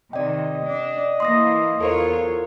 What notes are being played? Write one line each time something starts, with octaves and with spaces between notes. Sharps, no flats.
C3 D#3 D5 D#5 G5
D4
E3 A#3 C6 D#6 A#6
E2 F4 A4 A#4 C5 C#5